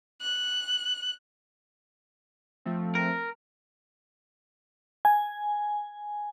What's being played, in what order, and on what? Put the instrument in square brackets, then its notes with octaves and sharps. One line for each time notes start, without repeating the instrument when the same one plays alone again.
[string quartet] F#6
[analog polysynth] F3 A3 C4
[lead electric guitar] A#4
[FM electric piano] G#5